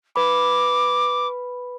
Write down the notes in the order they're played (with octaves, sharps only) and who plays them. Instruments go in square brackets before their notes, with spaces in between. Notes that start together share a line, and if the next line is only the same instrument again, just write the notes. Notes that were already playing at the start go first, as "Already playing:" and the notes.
[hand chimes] B4 B5 [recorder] D6